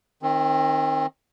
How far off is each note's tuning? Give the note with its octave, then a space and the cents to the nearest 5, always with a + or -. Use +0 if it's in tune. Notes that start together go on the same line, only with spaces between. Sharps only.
D#3 +0 C4 +30